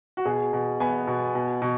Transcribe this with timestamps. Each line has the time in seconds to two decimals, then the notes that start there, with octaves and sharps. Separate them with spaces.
0.17 F#4
0.26 B2 G#4
0.53 B2
0.80 B3 G#5
1.07 B2
1.35 B2
1.62 B2